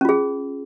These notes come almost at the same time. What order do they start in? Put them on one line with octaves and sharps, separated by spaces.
C#4 F4 G#4